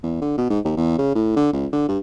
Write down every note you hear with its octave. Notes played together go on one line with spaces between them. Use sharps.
E2
D3
B2
G#2
D#2
E2
C#3
A2
D3
C#2
D3
G2